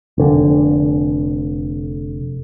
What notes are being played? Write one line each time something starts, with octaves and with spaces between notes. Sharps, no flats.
F1 D3